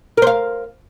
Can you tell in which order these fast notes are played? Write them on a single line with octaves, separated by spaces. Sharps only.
A#4 C5 F5